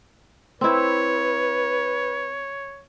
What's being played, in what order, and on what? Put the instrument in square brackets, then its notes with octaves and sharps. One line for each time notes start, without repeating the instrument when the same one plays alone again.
[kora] C4 E4 [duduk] B4 [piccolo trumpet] C#5